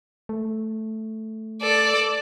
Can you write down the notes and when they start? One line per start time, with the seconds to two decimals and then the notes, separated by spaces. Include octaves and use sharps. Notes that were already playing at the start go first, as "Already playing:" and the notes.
0.29 A3
1.62 A4 D5